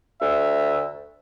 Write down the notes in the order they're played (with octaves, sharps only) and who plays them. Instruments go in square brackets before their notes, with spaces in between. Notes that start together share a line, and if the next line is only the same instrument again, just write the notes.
[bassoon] D2 [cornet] E5